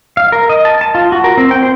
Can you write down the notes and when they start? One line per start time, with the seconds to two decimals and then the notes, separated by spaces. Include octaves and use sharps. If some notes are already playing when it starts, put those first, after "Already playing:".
0.17 F5
0.32 A#4
0.49 D#5
0.65 A5
0.81 A5
0.95 F4
1.12 F#4
1.24 A#4
1.37 C4
1.51 G5
1.63 C5